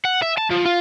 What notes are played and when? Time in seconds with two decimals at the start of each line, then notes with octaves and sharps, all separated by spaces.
0.05 F#5
0.22 E5
0.38 A5
0.51 F3
0.66 F4